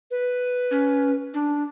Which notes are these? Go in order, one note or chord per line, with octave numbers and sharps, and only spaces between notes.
B4
C#4
D4